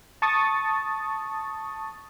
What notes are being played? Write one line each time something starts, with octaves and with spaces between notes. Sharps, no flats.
A5 C#6 D#6 A6